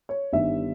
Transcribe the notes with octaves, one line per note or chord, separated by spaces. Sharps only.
C#5
G1 G2 D#3 E5